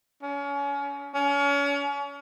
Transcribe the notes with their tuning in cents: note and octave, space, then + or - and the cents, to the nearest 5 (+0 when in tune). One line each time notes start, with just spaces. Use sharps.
C#4 +30
C#4 +35